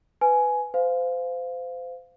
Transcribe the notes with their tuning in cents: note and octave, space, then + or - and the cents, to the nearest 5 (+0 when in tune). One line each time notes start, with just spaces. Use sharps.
B4 +15 G#5 +10
C5 -30 F5 +0